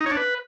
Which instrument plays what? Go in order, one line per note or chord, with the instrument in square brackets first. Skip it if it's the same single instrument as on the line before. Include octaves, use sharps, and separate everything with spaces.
[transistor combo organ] D#4
C#5
D4
B4